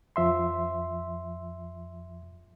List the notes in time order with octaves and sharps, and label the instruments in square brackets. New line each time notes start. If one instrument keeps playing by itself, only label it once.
[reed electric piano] F2 F3 E5 C6